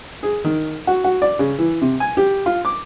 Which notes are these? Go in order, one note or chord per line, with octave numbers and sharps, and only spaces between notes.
G#4
D#3
F#4
F#4
D5
C#3
E3
C3
G#5
G4
F4
D6